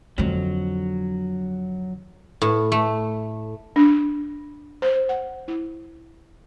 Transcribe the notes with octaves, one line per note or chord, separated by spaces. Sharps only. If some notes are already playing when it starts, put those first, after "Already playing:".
F2 D3 F#3
A2
A3
D4
C5
F#5
E4